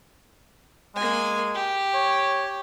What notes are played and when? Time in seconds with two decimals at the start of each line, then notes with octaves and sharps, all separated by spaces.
0.96 G#3 A#3 G#5
1.54 G4
1.94 C#5